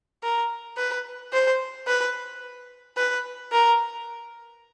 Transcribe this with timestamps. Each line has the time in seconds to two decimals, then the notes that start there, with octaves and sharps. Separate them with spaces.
0.23 A#4
0.77 B4
1.33 C5
1.87 B4
2.97 B4
3.52 A#4